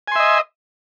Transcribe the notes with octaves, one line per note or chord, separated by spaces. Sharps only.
D#5 E5 G#5 C6